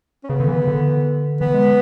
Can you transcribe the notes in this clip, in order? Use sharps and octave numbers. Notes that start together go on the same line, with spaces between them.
C#4
C#3 B3
D3
E3
D3
E3 B3
G#3